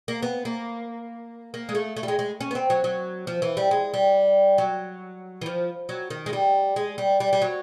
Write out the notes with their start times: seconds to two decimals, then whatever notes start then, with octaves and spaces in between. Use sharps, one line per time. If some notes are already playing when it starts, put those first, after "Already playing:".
0.08 A#3
0.23 B3
0.45 A#3
1.54 A#3
1.69 G#3
1.75 A3
1.96 A3
2.03 G3
2.08 G#3
2.19 G#3
2.41 C#4
2.51 B3
2.55 C4
2.70 F#3
2.84 F#3
3.27 F3
3.42 E3
3.57 G3
3.71 G#3
3.94 G3
4.58 F#3
5.41 E3
5.46 F3
5.89 F#3
6.10 D#3
6.26 G#3
6.33 G3
6.76 G#3
6.98 G3
7.20 G3
7.33 G3
7.42 F#3